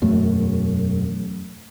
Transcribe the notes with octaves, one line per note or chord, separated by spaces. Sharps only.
E1 F#2 A3